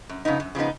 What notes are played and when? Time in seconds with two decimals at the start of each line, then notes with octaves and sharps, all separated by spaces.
0.09 F#2
0.25 C#3 F3 B3 D#4
0.40 F#2
0.55 C#3 F3 B3 D#4